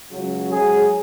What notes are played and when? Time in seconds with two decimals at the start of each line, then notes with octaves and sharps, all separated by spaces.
0.11 C#2 C#3 F#3
0.50 G#2 F#3 G#4